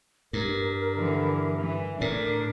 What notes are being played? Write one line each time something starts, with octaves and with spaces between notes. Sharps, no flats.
G2 A#4
D3 E3
E3
A2 D4 A#4